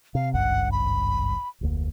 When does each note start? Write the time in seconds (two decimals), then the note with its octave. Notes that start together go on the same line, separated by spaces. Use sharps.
0.15 C3 F5
0.33 G#1 C#2 G2 F#5
0.72 B5
1.61 F1 D2 A#3